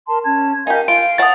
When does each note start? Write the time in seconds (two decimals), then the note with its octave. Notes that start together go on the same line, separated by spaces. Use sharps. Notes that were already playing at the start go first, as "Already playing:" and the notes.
0.08 A#4 A5 C6
0.25 C#4 A5 G#6
0.67 D#4 G4 A#4 F5 G#5
0.88 F4 F5 D7
1.18 C#5 F#5 A5 D#6 A6